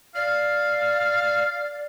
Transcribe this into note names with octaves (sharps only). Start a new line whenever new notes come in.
D5 F5